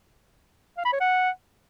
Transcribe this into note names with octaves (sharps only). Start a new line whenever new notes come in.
F5
B5
C#5
F#5